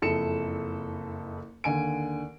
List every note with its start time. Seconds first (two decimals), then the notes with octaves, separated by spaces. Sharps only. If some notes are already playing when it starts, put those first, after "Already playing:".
0.02 F#1 F2 E4 A4 C#7 E7
1.64 D#2 D3 G#5 D7